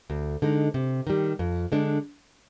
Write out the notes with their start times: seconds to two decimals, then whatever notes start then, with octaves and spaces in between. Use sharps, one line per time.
0.10 D2
0.42 D3 G#3 D#4
0.74 C3
1.07 D#3 G3
1.39 F2
1.72 D3 G#3 D4